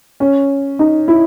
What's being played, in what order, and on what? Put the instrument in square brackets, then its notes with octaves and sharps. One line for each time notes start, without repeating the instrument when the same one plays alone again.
[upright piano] C#4
D#4
E4